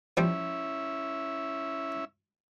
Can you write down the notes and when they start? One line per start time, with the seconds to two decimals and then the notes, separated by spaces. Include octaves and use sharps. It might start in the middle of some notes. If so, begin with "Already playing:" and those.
0.17 F3 G3 C#4 E4 C5 E5